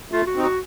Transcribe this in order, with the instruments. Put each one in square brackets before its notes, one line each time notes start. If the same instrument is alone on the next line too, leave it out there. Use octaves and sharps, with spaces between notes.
[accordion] A3 [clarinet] F4
[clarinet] F#4
[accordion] C4 D#4
[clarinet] F#4